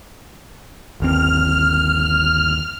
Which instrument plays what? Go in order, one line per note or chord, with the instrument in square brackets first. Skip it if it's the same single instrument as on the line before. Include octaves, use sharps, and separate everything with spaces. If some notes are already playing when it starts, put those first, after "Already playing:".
[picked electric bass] G1 D#2 C4 [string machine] F6